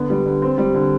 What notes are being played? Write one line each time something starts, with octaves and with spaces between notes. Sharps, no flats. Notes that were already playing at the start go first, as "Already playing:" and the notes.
Already playing: D3 B3
G3
D3
C4
G3
D3